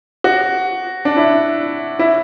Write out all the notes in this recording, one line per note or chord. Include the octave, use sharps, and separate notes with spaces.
F#4
D4
E4
E4